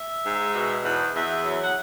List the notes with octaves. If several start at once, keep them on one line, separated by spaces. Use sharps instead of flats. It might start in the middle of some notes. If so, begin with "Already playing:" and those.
Already playing: E5
G#2
B2
E2
E2 E5
F#3
F#5